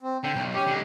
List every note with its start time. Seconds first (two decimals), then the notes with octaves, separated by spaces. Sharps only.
0.02 C4
0.24 D3 G5
0.35 B1
0.54 C#4 G4
0.66 D3 G#3